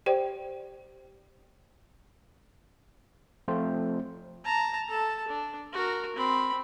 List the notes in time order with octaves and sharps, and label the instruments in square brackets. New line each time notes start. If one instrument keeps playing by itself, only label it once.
[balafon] G4 C5 D5 G5
[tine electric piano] F3 A3 C4 F4 C5
[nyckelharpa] A5 A#5
A4 A5
D4
F#4 A#4
C4 B5